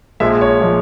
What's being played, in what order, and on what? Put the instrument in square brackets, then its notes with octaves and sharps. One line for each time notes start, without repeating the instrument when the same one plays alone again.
[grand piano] A#1 A#2 F3 G#3 E5
C#5
A#2 F3 G#3